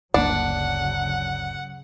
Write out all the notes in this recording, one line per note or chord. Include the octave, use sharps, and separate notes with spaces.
G1 D2 C#3 F#3 A#3 D4 F#5